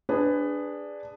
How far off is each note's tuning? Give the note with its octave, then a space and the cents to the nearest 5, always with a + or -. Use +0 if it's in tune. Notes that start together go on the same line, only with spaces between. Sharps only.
D4 +0 G#4 -15 B4 +15